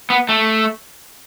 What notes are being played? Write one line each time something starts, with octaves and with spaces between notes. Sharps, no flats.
B3
A3